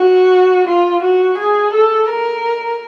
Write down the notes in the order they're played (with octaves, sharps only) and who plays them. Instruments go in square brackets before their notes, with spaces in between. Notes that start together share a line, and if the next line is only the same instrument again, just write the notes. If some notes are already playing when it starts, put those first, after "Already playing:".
Already playing: [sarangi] F#4
F4
F#4
G#4
A4
A#4